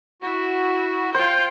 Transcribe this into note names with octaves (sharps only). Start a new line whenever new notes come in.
E4 F#4
F4 C5 G5